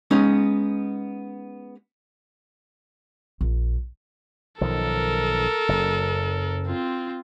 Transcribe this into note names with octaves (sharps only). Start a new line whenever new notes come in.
G#3 B3 C#4 D#4
A#1
B1 D#3 F3 A4 A#4
F#1 F#2
C4 F4